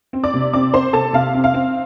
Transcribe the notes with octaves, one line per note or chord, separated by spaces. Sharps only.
C4
D5 D6
C3
C4 D5 D6
C4 C5 C6
C3 A4 A5
C3 F5
C4
F5
C4